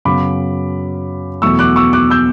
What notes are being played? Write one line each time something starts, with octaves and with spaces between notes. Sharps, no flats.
F#2 C#3 F#3 B3 B5 D6
E2 B2 F#3 A3 C#6 E6
D6 F#6
C#6 E6
D6 F#6
E6 G6